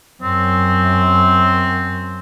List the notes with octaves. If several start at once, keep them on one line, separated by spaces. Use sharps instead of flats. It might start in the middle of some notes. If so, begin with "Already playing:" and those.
F#2 C4